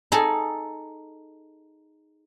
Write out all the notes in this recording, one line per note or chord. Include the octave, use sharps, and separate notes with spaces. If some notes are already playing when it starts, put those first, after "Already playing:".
D#4 G#4 A4